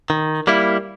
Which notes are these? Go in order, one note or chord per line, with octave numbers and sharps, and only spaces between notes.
D#3
G3 A#3 E4